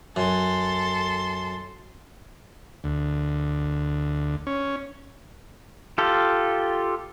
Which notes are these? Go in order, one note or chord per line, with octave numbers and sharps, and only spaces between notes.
F#2 A4 C6
D2
C#4
F4 G4 A4